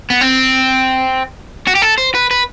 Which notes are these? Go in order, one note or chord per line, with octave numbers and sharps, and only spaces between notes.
B3
C4
F#4
G4
A4
C5
B4
B4